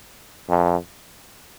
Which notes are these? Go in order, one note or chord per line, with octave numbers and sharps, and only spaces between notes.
F2